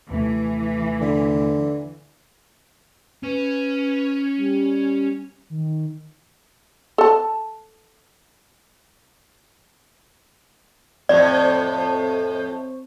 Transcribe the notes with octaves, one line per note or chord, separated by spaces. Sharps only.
D#2 C3 E3 A3
D3
C#4 B4
G3
D#3
A4 A5
F2 A2 C4 C5 D5 C#6